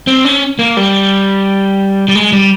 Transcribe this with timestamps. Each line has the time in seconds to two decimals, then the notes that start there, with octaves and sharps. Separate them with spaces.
0.07 C4
0.25 C#4
0.59 A#3
0.77 G3
2.08 G3
2.15 G#3
2.32 G3